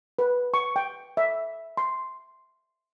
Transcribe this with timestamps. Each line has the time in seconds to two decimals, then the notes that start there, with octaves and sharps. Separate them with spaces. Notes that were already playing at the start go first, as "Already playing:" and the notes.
0.19 B4
0.54 C#6
0.76 G5
1.17 E5
1.77 C6